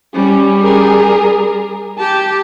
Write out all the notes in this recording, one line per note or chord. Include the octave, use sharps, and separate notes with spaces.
G3 C#4
G#4 A#4
G4 A5